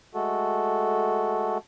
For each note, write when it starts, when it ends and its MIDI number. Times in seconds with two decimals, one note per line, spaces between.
0.15 1.58 56
0.15 1.58 57
0.15 1.58 66
0.15 1.58 69